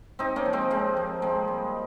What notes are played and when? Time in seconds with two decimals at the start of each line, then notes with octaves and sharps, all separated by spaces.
0.19 C3 C4 D#4
0.36 A#3 C#4
0.46 F3
0.53 G#3 C4
0.71 C3 G#3 C4
0.97 F3
1.22 A#2 G#3 C4
1.48 G3